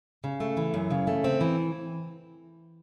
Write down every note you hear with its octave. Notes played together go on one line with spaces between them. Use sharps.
C#3
A3
E3
F#2
C#3
A3
C4
E3